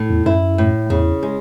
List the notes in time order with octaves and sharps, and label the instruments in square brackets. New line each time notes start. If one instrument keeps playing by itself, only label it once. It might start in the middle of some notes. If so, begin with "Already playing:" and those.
Already playing: [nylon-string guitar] A2
[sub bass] E2
[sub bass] F#2 [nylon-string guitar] E4
[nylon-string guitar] A2
[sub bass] E2 [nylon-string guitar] C#3
[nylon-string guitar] G#3